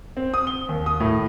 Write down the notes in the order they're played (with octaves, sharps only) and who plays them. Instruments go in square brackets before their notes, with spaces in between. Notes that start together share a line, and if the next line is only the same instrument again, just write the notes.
[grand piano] C4
D#6
G7
D#2
D#6
A2